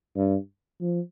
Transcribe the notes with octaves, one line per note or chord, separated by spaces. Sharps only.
G2
F3